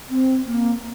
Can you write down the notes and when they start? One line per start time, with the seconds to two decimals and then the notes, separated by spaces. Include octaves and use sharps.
0.09 C4
0.45 A#3